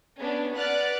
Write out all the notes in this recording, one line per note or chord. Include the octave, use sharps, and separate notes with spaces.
B3 C#4 D4
B4 D5 F#5 F6 F#6 A6